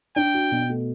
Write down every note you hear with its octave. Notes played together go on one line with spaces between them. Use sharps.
D4 G5
F#4
B2
A3